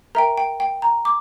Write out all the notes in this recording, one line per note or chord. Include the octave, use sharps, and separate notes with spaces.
A#4 E5 G5 A#5
G5
G5
A#5
D6